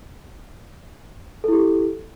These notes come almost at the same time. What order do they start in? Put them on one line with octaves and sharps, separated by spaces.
A4 E4 G4